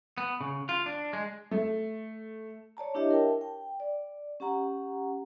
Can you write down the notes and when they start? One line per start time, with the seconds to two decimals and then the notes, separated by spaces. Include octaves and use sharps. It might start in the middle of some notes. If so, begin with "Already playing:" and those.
0.18 B3
0.41 C#3
0.69 F4
0.86 D4
1.13 G#3
1.51 A3
2.77 C#5 D5 A5 A#5
2.94 D4 E4 G4 C#5 D#5 E5
3.11 A#4 G5 A5
3.41 G5
3.80 D5
4.40 C#4 G4 F#5 A#5